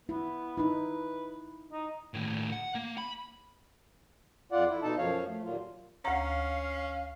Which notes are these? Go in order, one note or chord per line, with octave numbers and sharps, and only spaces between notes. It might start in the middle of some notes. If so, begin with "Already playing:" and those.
B3 E4
D#4 E4 B4
D#4
D#2 A2
F#5
A#3
B5
F2 F4 D5 F#5
E4
B2 D#4 A4 A5
F#2 F3 C#5 F5
A3
D#2 A#2 F#3 A#3 F4
D2 C#4 F5 A#5